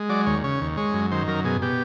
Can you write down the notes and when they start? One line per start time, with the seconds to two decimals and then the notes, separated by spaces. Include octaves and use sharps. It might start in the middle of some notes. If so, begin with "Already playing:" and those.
Already playing: G#3
0.09 F#3 D5
0.26 D#2 C#5
0.44 C#3 C#5
0.61 D#2
0.77 G#3 C#5
0.94 F#2
1.11 D#3 C5
1.27 F#2 A#4
1.44 B2 G#4
1.62 B2 G4